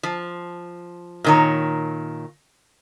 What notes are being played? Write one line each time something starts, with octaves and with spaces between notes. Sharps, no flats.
F3
A#2 D#3 C#5